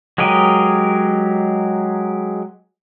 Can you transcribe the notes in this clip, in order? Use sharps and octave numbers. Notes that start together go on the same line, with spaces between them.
F#3 G#3 G4 A#4 D#5